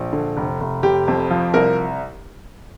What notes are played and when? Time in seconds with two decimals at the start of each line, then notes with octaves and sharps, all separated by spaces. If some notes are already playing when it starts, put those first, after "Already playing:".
Already playing: A#1
0.13 D3
0.37 F1
0.61 F1
0.83 F1 G4
1.08 F2
1.31 F3
1.54 C2 A#4